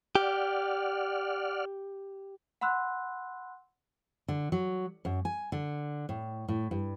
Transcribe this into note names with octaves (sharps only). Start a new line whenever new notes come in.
G4 D5 F#5 F6
F#5 B5 C6 E6 F#6
D3
F#3
F#2
G#5
D3
A2
A2
G2